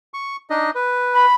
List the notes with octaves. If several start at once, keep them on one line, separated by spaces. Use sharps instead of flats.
C#6
D4 D#4 D#5
B4
B5